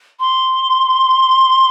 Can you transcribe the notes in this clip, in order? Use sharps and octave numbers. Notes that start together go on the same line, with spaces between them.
C6